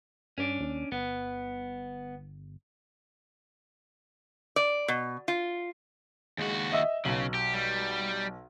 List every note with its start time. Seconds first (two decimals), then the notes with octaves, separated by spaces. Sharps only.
0.38 G2 C#4 D4
0.60 D#2
0.92 G1 B3
4.56 D5
4.88 B2
5.28 F4
6.38 D#2 G#3 F#4
6.72 D#5 E5 E6
7.05 B1 C#3 F#7
7.34 G4
7.54 G3